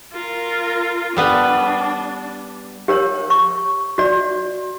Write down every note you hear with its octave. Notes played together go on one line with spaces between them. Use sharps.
F4 A#4
G3 B3 D4 B4
G4 A#4 C#5
C#6
F#4 D5